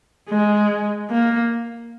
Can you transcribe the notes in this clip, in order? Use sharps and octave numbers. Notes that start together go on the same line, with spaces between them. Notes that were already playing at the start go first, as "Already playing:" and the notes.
G#3
A#3